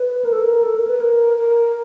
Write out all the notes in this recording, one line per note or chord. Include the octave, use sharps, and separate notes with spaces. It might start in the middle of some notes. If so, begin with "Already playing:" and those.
Already playing: B4
A#4
A4
A#4
A4
A#4
B4
A#4
A#4